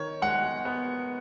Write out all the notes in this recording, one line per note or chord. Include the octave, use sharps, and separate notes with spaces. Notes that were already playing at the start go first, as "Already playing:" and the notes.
Already playing: D#3 C#5
G#3 F#5
B3